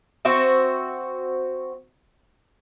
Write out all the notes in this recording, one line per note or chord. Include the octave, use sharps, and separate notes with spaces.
C4 F#4 E5